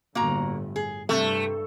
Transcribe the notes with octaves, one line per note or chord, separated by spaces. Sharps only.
G1 A2 A#3 F#4 A#5
G#4
G2 C3 A3